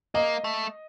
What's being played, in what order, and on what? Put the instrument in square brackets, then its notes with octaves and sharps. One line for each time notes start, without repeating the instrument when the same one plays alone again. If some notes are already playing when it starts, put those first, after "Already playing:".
[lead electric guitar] A#3 [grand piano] D#5
[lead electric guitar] A3